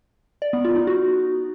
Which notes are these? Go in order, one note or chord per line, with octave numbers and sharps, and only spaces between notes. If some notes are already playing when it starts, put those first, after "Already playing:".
D5
B3
F4
D#4
F#4